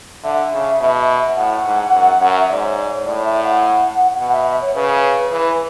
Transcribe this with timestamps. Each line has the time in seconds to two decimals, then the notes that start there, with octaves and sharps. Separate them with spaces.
0.24 D3 E5
0.52 C#3
0.81 B2
1.36 A2 F#5
1.65 G#2
1.93 F#2
2.21 F#2
2.39 E5
2.50 G#2 D5
2.63 C#5
2.78 D5
2.92 C#5
3.06 A2 D5
3.24 E5
3.43 F#5
4.18 B2 F#5
4.32 E5
4.47 E5
4.61 C#5
4.75 C#3 B4
5.32 E3